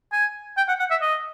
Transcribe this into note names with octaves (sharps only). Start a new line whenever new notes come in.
G#5
G5
F#5
F#5
E5
D#5